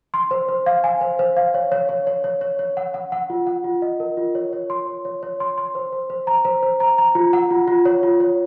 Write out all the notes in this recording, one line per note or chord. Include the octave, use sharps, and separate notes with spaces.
C6
C5
C5
F5
G#5
C5
C5
F5
C#5
C#5
C#5
C#5
C#5
C#5
C#5
F#5
F#5
F#5
F4
F#5
F4
D#5
A#4
F4
C#5
C#5
C6
C#5
C#5
C#5
C6
C6
C5
C5
C5
A#5
C5
C5
A#5
A#5
F4
F#5
F4
F4
C#5
F4
C#5